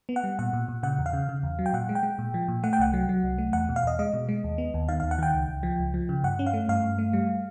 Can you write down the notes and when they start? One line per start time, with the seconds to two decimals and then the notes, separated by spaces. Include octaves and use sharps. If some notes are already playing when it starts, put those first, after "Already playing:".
0.09 B3
0.16 F#5
0.24 G3
0.39 A#2 F#5
0.53 A#2
0.68 A#2
0.83 C#3 F#5
0.99 E2
1.06 F5
1.13 C#3
1.29 C#3
1.43 E2
1.59 F#3
1.66 G5
1.73 A#2 F#5
1.89 G#3
1.95 G5
2.03 G#3
2.18 A#2
2.34 F3
2.48 A#2
2.63 A3 F#5
2.73 G5
2.79 C2 F#5
2.94 F#3
3.09 F#3
3.24 C2
3.38 A3
3.53 E2 F#5
3.69 B2
3.76 F5
3.83 E2 D#5
3.99 G#3 D#5
4.13 B2
4.29 G#3
4.44 D#2
4.58 B3
4.74 D#2
4.89 D#3 F5
5.00 D#2 F5
5.11 F#5
5.19 D#3 G5
5.33 C#2
5.49 C#2
5.63 F3
5.79 C#2
5.94 F3
6.09 C#3
6.23 G2 F#5
6.39 C#4
6.46 F5
6.53 A3
6.69 G2 F5
6.84 G2
6.98 A3
7.13 G3